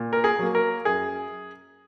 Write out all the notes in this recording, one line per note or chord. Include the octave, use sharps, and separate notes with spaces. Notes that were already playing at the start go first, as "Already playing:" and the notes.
Already playing: A#2
A#4
G#4
F#3 A#3
A#4
F#2 G#4